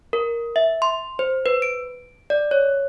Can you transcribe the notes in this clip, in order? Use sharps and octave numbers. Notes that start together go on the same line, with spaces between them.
A#4
E5
C6
C5
B4
D7
D5
C#5